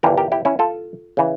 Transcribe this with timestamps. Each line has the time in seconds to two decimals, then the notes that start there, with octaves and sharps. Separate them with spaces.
0.03 G1 G2 E3 G4 A#4
0.18 G4 A#4
0.32 E4 G4
0.45 C#4 E4
0.59 F4 A4
1.17 C#3 E3